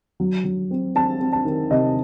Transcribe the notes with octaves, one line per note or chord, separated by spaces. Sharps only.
F#3
F#3
C4
C4 A5
C4
A5
D#3
C3 D#5